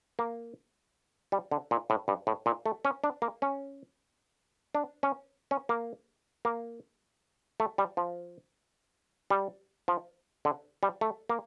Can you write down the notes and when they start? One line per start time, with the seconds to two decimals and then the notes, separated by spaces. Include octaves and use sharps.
0.19 A#3
1.32 G3
1.51 D3
1.71 A#2
1.90 A2
2.08 G2
2.27 A2
2.46 A#2
2.66 A3
2.85 C#4
3.04 D4
3.22 A#3
3.42 C#4
4.75 D4
5.03 C#4
5.51 C#4
5.69 A#3
6.45 A#3
7.60 A3
7.78 G3
7.97 F3
9.30 G3
9.88 F3
10.45 D3
10.83 G3
11.01 A3
11.29 A#3